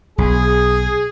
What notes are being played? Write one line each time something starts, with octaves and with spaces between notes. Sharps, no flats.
B1 G#4